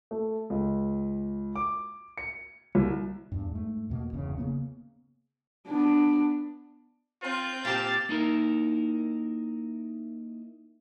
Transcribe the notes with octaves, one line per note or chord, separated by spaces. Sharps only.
A3
C#2
D6
C#7
C2
E2 G2
G#2 A3
E2 B2 A#3
G1 E2 C#3
C#3 A#3 B3
B3 D4
C4 F4 G6
A#2 G4 F5 A5 A6
A#3 D#4 E4 A#4